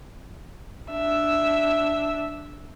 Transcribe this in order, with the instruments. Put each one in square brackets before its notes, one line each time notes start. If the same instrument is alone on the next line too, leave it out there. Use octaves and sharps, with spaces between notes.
[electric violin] D4 E5